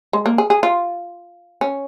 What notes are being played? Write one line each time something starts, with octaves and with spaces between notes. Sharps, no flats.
G#3
A#3
G#4
G#4
F4
C#4